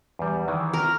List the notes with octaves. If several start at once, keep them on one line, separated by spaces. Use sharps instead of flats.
E2 G3
D#3 E3
A#4